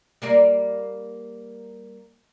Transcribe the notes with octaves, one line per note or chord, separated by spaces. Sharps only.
G3 A#3 D5